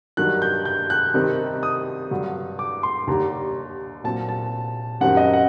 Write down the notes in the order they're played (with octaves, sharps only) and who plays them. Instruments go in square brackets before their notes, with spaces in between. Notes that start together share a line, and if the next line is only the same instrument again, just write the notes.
[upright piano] G2 D#3 F#3 F#6
G6
G6
F#6
C3 D#3 G3 C4 D#4
D#6
G2 D3 F#3
D6
C6
D#2 D3 G3 A#5
A#2 F#3 C4 A5
A5
F#2 D#3 G3 C4 F#5
D#5
F#5